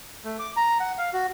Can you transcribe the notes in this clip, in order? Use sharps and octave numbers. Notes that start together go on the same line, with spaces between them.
A3
D6
A#5
F#5
F5
F#4